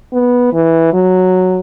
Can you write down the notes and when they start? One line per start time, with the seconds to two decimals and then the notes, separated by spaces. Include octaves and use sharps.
0.13 B3
0.53 E3
0.94 F#3